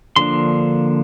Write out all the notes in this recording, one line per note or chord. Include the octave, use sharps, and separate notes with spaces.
D3 F3 A#3 D4 C6